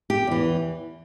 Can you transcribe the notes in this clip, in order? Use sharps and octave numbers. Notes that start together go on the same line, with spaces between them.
G4
E2 E3